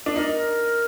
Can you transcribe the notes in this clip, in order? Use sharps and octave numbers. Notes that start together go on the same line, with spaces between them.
D4
D#4 A#4